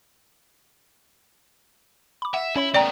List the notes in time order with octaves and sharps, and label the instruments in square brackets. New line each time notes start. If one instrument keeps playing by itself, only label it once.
[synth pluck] B5 D6
[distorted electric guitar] E5 [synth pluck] F#5
[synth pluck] C#4 C#5 B5 [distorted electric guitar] E4
[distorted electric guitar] A3 B3 [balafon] D5 G5 A#5